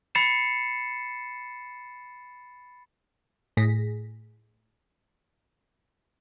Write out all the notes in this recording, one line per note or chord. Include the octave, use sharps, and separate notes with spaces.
B5 A6 C7 C#7 E7
A2 G#4 A#6 B6